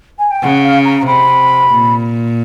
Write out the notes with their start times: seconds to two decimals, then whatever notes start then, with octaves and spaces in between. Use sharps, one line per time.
0.19 G#5
0.31 G5
0.43 C#3 F#5
0.64 F5
0.85 A#5
1.06 C3 B5
1.70 A#2